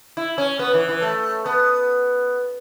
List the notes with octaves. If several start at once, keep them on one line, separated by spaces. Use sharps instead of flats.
E4
C#4
B3
E3
E3
A3
B3